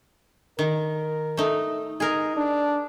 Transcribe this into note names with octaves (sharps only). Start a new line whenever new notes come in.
D#3 A#4
A3 D#4
D#4 G#4 A#4
D4